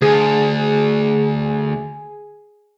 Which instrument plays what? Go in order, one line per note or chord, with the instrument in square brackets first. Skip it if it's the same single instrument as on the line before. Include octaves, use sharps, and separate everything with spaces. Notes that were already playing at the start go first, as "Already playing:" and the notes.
[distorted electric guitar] D2 [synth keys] G#4